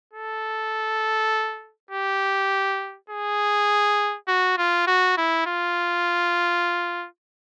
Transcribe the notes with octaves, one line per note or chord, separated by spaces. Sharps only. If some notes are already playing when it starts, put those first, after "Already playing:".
A4
G4
G#4
F#4
F4
F#4
E4
F4